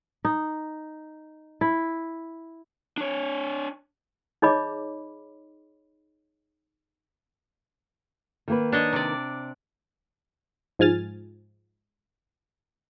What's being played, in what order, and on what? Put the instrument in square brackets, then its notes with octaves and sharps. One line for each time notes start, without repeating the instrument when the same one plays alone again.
[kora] D#4
E4
[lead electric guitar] D4 C#5
[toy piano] D#4 G#4 C#5 D#5 B5 D6
[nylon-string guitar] D#3 A#3 B4
[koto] D4 C#5 D#5
C3 D5
[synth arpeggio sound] G#2 F3 G#5 F6 A6